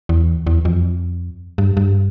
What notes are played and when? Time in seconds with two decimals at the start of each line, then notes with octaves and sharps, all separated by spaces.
0.09 E2
0.47 E2
0.65 F2
1.58 G2
1.77 G2